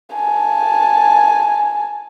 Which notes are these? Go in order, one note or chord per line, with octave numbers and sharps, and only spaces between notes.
G#5 A5